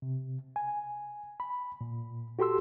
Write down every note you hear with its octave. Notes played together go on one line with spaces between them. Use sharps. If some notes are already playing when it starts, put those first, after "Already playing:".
C3
G#5
B5
A#2
F#4 G4 A4 C6 E6